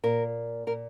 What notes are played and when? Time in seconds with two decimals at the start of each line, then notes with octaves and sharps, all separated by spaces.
0.03 A#2 A#4
0.67 A#2 A#4